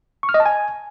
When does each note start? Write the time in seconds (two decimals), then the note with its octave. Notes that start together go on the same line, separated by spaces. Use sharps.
0.23 C#6
0.29 F6
0.34 D#5
0.40 A5
0.46 G#5